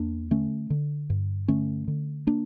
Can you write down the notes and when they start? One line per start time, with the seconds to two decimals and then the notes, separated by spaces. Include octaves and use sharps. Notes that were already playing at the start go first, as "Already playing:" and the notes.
Already playing: E2 A#3 D4
0.31 D3 A3 C#4
0.70 D3
1.10 G2
1.48 D3 A3 C#4
1.88 D3
2.27 A#3 D4